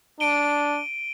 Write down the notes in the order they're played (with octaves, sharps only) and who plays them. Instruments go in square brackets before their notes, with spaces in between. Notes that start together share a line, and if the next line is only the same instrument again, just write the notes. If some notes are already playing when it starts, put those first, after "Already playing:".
[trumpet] D4 [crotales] D7 D#7 G7